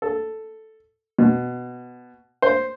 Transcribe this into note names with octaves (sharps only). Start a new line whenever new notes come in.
A4
B2
C5